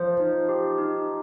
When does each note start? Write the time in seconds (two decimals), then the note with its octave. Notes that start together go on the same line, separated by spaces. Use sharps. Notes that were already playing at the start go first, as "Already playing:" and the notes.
Already playing: F3 C5
0.20 D#4
0.49 G4
0.78 D#4